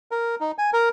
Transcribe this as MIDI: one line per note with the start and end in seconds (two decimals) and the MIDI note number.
0.11 0.35 70
0.40 0.51 63
0.58 0.70 80
0.73 0.89 70